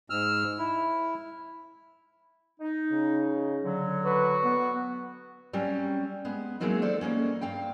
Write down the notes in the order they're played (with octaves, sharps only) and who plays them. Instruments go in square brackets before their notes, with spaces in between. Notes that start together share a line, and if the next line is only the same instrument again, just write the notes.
[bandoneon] G#2 E6 F6
E4
[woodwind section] D#4
[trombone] C#3
[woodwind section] D3 F#3
[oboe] F#4 [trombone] B4
[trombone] B3
[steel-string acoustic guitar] F#3 G3 C4 C#4
G#3 B3
E3 F#3 G#3 A#3 C4 D#4
A4 C5 D5
G3 G#3 A#3 C#4
G2 C4 F5 G5